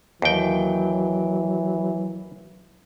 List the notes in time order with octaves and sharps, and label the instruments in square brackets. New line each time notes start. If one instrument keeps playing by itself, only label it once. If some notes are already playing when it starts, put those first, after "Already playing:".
[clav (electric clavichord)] D#2 G5 [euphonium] E3 [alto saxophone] F#3